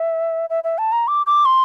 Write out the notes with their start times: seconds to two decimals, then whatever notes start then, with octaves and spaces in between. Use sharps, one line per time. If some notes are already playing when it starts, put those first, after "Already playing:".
Already playing: E5
0.50 E5
0.64 E5
0.78 A5
0.92 A#5
1.08 D6
1.27 D6
1.45 C6